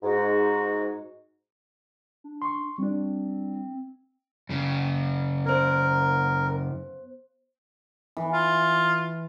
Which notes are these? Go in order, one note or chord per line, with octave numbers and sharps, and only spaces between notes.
G#2 F#4
D4
C6 C#6
G3 C4 D4
F#2 C#3
B3 A#4 C5
E3
F4